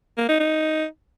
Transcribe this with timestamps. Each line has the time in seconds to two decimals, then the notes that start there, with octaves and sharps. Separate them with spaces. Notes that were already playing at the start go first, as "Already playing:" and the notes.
0.18 A#3
0.29 D#4
0.40 D#4